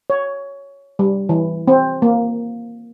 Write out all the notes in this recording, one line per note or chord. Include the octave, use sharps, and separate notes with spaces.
C#5
G3
E3
C4
A#3